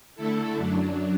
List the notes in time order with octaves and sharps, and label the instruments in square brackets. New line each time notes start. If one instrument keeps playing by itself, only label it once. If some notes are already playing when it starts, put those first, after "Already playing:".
[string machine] D3 A3 E4 A4
F#2 F#3 D4